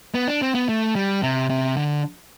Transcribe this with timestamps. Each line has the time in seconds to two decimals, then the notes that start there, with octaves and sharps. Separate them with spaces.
0.14 B3
0.28 D4
0.42 C4
0.55 B3
0.69 A3
0.96 G3
1.23 C3
1.50 C3
1.77 D3